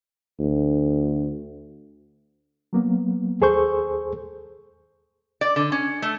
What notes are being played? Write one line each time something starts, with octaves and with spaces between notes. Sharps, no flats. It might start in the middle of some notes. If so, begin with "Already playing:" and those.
D2
F#3 A#3 B3
D#2 G#4 A4 C5 C#6 G6
D5
D3
C#4
A3